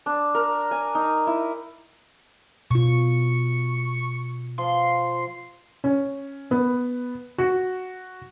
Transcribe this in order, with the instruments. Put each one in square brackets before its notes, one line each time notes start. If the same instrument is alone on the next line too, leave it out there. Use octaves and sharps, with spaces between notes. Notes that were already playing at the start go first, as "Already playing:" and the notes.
[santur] D4
A#4
G#5
D#4
E4
[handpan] B2 F4 [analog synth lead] C#6
[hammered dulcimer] F3 [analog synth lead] C6
[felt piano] C#4
B3
F#4